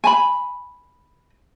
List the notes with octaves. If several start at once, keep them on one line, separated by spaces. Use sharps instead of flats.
G#5 A5 B5